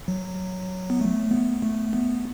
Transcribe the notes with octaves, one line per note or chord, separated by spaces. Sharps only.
F#3
B3
A3
B3
A3
B3